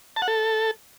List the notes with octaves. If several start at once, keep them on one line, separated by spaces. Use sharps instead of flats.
A5
F#5
A4